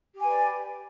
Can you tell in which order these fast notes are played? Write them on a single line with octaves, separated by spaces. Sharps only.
G4 G#5 B4 D5